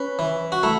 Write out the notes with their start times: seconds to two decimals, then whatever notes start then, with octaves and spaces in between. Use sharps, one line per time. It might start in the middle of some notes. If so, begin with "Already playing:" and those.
Already playing: C#4 B4
0.19 E3
0.52 F#4
0.63 A3 E4